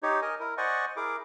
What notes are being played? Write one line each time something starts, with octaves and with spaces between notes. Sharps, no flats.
D#4 G4 C#5
A#4 D#5 G#5
E4 A#4
C5 D5 D#5 F#5 G#5 C#6
E4 G#4 A#4 D6